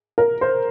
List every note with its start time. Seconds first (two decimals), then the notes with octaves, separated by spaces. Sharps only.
0.18 A#4
0.41 C5